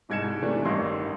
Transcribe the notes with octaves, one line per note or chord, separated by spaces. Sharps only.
E1 C2 G#2 G#6 C#7 E7
C3 E3 A3 D4
A1 G2 D#3 D#5 C6 E6